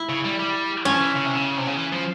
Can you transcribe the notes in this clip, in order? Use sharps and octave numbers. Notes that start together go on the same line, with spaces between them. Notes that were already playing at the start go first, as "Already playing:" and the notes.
Already playing: E4
C#3
G3
G3
F3 C#4
E3
C#3
C3
C#3
C3
C#3
E3
F3